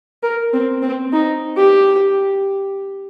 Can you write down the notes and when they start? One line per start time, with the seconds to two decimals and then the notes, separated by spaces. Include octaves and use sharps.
0.23 A#4
0.53 C4
0.82 C4
1.13 D#4
1.57 G4